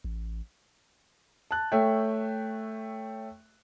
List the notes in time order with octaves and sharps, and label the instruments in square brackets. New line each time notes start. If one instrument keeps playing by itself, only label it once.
[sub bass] A1
[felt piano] A5 F#6
A3 C#5 E5 G5